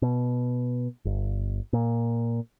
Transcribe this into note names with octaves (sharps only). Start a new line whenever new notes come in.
B2
G1
A#2